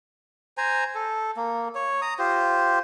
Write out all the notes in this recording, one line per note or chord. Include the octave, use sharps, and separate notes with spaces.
C5 G#5 A#5
A4
A#3
C#5
A#5 D#6
F4 G4 C5